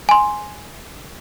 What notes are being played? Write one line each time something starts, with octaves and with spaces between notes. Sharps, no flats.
G#5 C6